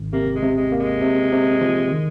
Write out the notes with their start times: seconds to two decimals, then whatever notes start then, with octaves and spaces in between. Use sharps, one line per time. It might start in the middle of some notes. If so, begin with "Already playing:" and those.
Already playing: G#1
0.13 C3 A#3
0.35 G#3
0.42 C3
0.57 G#3
0.72 A#3
0.79 G#3
1.02 C3
1.32 C3
1.61 F3
1.91 D#3